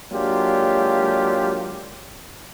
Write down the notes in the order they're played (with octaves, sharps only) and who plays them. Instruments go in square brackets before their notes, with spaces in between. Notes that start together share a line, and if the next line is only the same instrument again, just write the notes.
[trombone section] F#3 G#3 A#3 D4 F4 G4